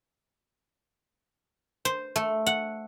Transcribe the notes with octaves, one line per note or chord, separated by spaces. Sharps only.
C5
A3
F#5